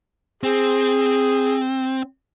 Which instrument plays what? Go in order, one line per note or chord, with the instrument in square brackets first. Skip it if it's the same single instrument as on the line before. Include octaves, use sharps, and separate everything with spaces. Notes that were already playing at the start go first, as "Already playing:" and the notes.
[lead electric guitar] C4 [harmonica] G#4